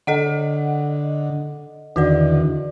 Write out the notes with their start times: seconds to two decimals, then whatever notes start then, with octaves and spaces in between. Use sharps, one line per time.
0.07 D3 A4 D#5 F#5
1.96 E2 D3 D#3 F#4 B4 D5